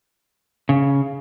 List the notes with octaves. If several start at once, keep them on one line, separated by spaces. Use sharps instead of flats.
C#3